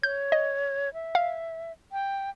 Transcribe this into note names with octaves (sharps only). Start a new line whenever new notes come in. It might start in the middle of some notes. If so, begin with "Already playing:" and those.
C#5 G6
D#5
E5
F5
G5